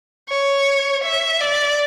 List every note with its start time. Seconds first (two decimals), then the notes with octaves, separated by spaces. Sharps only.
0.29 C#5
1.04 E5
1.41 D5